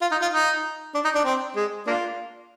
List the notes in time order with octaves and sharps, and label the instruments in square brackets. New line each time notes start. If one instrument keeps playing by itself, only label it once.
[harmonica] F4
D#4
F4
D#4
D4
D#4
D4
C4
G#3
A#3 D4 F4